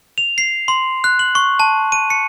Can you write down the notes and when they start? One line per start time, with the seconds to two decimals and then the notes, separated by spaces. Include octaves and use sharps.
0.18 F7
0.38 C7
0.68 C6
1.04 F#6
1.19 F#7
1.35 C#6
1.60 A5
1.92 D#7
2.10 C#7